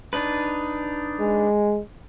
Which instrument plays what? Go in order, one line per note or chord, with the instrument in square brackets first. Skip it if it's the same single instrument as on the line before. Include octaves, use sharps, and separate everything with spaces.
[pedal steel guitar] D4 D#4 B4
[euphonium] G#3